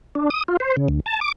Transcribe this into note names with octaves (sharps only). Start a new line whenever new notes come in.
D4
D#6
F4
C5
C#3
D2
A5
D6